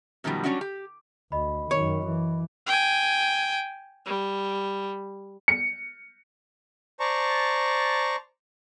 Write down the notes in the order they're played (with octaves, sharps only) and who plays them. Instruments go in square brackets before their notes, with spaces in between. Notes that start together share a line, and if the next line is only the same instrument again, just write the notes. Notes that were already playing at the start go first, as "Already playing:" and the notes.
[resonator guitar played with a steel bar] F#2 B2 D#3 F3 G3
F#3 G3 C#4 D4 E4 F#4
G4
[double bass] D2 [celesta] D#5 B5
[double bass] F#2 D#3 [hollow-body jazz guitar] C#5
[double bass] E3
[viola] G5 G#5
G3
[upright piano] C#7
[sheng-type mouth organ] C5 D5 A5 A#5 C#6